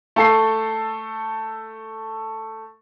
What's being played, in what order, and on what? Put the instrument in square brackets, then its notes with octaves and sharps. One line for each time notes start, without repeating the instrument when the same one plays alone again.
[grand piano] A3 A4 C7